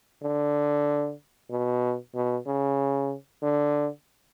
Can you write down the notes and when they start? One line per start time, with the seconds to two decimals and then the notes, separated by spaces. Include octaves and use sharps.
0.22 D3
1.50 B2
2.14 B2
2.46 C#3
3.42 D3